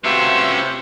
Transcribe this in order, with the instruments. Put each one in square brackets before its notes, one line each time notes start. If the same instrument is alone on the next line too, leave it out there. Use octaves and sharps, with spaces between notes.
[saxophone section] C3 [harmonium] A3 F#4 B4 [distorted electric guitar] C#4 F4 [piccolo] E5